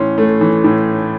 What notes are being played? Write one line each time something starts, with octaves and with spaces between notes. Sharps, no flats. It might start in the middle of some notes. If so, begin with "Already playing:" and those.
Already playing: A2 E3 C#4 C6
A3
E3
A2